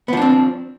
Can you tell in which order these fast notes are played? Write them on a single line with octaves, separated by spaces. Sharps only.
B3 F3 D4 C4